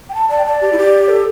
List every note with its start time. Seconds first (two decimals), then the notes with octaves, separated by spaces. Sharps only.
0.09 G5
0.15 A5
0.30 D5 A5
0.38 G5
0.46 D5 A5
0.61 G4
0.73 E4
0.78 G4
1.09 A4